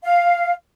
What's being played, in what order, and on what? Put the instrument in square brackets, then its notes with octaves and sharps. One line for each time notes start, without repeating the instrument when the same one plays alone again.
[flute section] F5